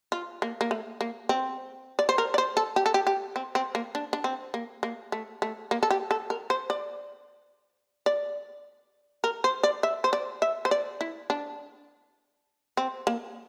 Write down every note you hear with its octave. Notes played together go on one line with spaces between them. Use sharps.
F4
A#3
A#3
A3
A#3
C4
D5
C5
A#4
D5
C5
A4
G4
A4
G4
G4
C4
C4
A#3
D4
D4
C4
A#3
A#3
A3
A3
A#3
A4
G4
A4
A#4
C5
D5
D5
A#4
C5
D5
E5
C5
D5
E5
C5
D5
E4
D4
C4
A#3